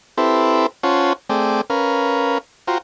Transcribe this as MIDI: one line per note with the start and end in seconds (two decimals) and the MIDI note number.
0.18 0.66 60
0.18 0.66 64
0.18 0.66 67
0.18 0.66 69
0.18 0.66 71
0.18 0.66 72
0.83 1.13 61
0.83 1.13 65
0.83 1.13 72
0.83 1.13 73
0.83 1.13 78
0.83 1.13 81
1.30 1.61 57
1.30 1.61 60
1.30 1.61 68
1.30 1.61 74
1.30 1.61 79
1.70 2.38 61
1.70 2.38 70
1.70 2.38 71
1.70 2.38 77
2.67 2.78 65
2.67 2.78 66
2.67 2.78 72
2.67 2.78 79
2.67 2.78 82